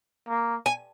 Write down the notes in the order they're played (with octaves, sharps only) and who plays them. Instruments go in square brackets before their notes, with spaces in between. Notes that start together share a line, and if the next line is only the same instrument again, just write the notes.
[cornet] A#3
[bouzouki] G#5